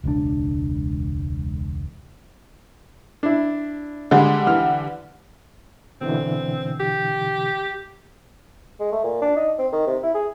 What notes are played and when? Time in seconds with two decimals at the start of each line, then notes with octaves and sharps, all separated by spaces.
0.04 E1 C#2 B2 D4
3.23 D4 E4
4.11 D3 G3 G#3
4.47 E3 F6
6.01 B2 D3 E3 C4
6.80 G4
8.80 G#3
8.92 A3
9.04 A#2
9.22 D4
9.36 D#4
9.59 C4
9.72 D#3
9.87 C3
10.03 E4
10.14 G#4